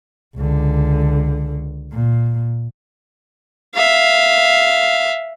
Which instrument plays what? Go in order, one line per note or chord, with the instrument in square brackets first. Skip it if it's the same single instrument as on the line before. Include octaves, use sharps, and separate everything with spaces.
[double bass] C#2 D3
A#2
[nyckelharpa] E5 F5